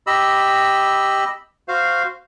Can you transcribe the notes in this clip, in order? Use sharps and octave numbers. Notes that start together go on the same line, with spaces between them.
G4 D#5 B5 E6
F#4 C5 F5